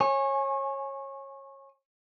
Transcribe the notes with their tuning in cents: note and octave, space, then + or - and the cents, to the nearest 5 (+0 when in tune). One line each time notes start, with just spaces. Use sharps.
C#5 -25 G#5 +0